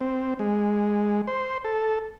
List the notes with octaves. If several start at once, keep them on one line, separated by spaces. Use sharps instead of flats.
C4
G#3
C5
A4